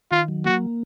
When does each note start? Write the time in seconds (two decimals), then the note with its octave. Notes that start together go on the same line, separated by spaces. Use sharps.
0.11 D#3 F4
0.28 F#3
0.45 A#3 F#4